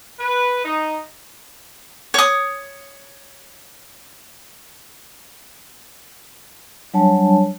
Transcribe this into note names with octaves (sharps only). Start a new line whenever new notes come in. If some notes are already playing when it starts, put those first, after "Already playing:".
B4
D#4
C#5 D#6
F#3 G3 D4 C#5 G#5 A5